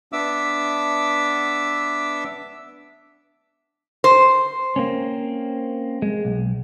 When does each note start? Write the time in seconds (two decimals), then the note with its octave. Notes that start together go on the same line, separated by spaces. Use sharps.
0.13 B3 D4 E5 D6 E6
4.04 C5
4.76 A#3 C4 C#4
6.02 G#3
6.25 B1